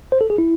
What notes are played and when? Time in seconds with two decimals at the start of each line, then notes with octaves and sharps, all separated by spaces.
0.12 C5
0.21 A4
0.30 G#4
0.38 E4